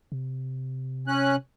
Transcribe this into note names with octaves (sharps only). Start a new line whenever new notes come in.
C3
C#4 F#6